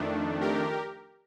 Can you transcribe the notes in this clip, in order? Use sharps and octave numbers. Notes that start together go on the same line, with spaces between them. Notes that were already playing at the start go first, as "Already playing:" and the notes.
Already playing: F2 D#3 A3 D4
G4 A#4